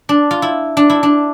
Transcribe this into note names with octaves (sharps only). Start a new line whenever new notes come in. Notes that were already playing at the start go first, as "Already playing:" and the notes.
D4
F4
E4
D4
E4
D4